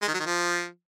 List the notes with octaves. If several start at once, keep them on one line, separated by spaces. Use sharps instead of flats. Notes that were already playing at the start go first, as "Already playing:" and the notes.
G#3
D#3
F#3
D#3
F3